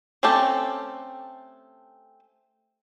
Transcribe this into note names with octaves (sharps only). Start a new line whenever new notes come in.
A3 C4 C#4 G4 A4